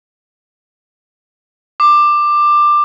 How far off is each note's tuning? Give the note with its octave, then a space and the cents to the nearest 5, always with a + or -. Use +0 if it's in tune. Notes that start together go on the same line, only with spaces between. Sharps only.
D6 +15